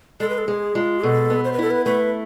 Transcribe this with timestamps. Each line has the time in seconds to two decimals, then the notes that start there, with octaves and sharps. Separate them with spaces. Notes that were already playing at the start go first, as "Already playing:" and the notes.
0.20 G#3 A4
0.30 B4
0.38 A4
0.48 G#3 G#4
0.75 G#3 F4
1.03 B2 A4
1.30 B3
1.45 C5
1.53 B4
1.59 E4 A4
1.71 B4
1.86 A3 B4